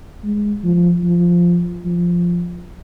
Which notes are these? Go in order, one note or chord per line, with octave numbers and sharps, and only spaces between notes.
G#3
F3
F3
F3